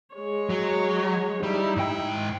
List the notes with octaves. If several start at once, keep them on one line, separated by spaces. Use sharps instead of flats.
G#3 C#5
F#3
G3 D#4 E4
G#2 G5